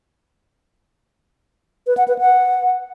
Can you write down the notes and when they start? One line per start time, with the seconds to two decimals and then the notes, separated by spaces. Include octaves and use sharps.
1.87 B4
1.97 F#5
2.08 B4
2.19 F#5